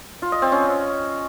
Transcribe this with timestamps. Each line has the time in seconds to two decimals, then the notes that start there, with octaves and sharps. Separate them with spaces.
0.22 F4
0.32 D#5
0.42 C4
0.52 C#4